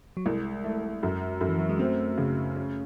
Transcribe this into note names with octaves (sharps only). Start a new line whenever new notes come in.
F#3
C2 G#3
A3
F#2
F#2
E3
F#3
G#3
A3 C4
C#3
C#4